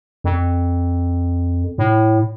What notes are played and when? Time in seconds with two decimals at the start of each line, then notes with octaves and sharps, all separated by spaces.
0.24 F2
1.78 A2